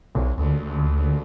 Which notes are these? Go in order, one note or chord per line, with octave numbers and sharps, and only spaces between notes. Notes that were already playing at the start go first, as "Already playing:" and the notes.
B1
D2